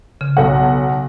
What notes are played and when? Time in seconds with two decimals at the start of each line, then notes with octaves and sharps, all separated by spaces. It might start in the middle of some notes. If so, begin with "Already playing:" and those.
0.21 C#3
0.37 B1 A4 F#5